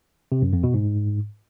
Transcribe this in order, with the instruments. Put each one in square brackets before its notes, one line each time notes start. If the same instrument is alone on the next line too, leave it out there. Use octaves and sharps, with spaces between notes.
[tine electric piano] C3
F#2
F2
B2
G#2